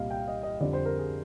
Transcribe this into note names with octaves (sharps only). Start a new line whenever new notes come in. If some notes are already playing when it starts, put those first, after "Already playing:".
Already playing: C2 A#2 G3 D#5 F5
G5
D#5
D#5
F2 D3 G3 D5
C5
A#4
G#4